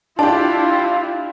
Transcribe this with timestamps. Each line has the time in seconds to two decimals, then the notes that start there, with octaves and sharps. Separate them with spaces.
0.19 D4 E4 F4 G4 A5